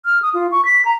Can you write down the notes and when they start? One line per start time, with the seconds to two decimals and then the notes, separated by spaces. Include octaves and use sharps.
0.05 F6
0.22 D#6
0.34 F4
0.52 C#6
0.65 B6
0.85 A#5